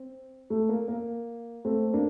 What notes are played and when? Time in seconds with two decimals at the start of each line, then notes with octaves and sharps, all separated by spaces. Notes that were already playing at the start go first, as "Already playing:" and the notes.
Already playing: C4
0.50 A3
0.69 A#3
0.88 A#3
1.65 A3 C4
1.93 A#3 D4